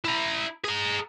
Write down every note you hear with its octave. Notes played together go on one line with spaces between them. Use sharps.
E4 A#5
G#4 A#5